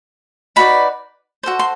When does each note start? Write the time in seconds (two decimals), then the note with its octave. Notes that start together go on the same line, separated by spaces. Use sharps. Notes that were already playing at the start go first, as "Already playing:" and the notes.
0.56 D#4 F#4 B4 D5 B5
1.43 F#4 A4 C5
1.59 C6